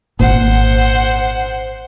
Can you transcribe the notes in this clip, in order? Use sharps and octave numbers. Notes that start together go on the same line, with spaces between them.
G#1 A#2 C5 F#5